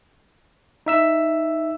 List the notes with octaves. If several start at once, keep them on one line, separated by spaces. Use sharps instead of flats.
D#4 E5 E6